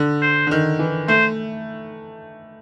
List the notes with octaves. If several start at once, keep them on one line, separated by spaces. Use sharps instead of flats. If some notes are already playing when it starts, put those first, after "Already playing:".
Already playing: D3
C5
D3
D#3
E3
A3 C5